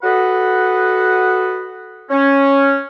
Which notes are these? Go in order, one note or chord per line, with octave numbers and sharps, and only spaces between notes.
F#4 A4 B4 D#5 F#5
C#4